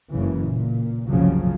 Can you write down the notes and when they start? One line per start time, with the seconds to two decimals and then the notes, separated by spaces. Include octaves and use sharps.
0.13 F#1 G#2 C#3 E3
0.44 A#2
1.08 F#1 C2 C#3 F3 F#3